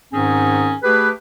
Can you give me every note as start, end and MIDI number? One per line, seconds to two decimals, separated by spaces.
0.13 0.74 44
0.13 0.74 51
0.13 0.74 60
0.13 0.74 61
0.13 0.74 68
0.83 1.10 57
0.83 1.10 67
0.83 1.10 68
0.83 1.10 71